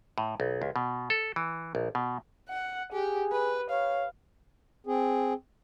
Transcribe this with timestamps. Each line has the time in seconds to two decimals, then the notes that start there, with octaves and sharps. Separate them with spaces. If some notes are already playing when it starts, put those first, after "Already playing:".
0.18 A2
0.40 B1
0.62 C#2
0.76 B2
1.10 A4
1.36 E3
1.75 A#1
1.95 B2
2.49 F#5
2.93 G4 G#4
3.32 B4
3.71 C#5 F5
4.87 C4 G#4